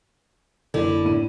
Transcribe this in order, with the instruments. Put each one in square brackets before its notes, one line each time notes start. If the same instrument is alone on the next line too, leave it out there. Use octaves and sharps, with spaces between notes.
[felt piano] F#1 [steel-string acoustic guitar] D3 E4
[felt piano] A2 D4 D#7